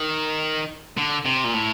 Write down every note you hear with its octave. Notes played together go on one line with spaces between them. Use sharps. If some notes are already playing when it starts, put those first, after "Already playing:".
Already playing: D#3
D3
C3
A#2
A2